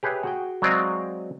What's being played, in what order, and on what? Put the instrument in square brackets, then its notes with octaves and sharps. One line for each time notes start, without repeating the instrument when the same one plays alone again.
[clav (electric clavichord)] G4 G#4 B4 C#5 E5 G5
F#4 G#4 G5
F#3 G#3 C4 D5 D#5 F5